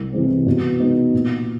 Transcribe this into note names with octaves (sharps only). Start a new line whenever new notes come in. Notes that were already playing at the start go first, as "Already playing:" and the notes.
Already playing: C2
C3 E3 G#3 C4
B2
G#3 B3 D#4
A#2